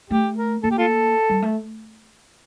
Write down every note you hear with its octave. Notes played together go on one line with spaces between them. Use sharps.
A3 G4
A#4
A#3 A4
G4
F4 A4
G3
A3